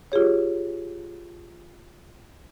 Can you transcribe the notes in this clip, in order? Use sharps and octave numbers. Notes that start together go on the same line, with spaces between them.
F4 G4 G#4 C#5